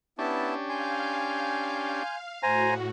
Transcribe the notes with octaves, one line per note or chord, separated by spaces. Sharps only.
B3 C#4 D4 E4 G4 A5
F5 G#5 C6 G6
A2 F#4 C5 G#5 A#5